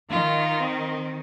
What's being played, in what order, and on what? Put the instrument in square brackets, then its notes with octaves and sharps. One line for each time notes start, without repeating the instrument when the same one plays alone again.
[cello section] D#3 [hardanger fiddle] F4
[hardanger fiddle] C4